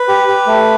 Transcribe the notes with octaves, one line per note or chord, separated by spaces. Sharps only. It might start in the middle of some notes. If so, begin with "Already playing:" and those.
Already playing: B4
G4
G4
A3